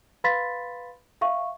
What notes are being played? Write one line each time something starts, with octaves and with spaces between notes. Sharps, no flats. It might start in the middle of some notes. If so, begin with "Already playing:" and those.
B4 F5 B5 C6 A6 B6
E5 F5 C#6